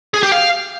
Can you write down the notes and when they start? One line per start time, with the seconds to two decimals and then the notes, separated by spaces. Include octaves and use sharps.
0.14 G#4
0.23 G4
0.32 F5